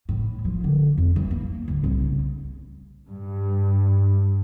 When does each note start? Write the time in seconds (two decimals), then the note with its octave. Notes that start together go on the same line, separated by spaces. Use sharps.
0.09 A2
0.45 F3
0.64 D3
0.98 F2
1.16 E3
1.31 A#3
1.68 D2
1.84 C2
2.02 C#3
3.08 G2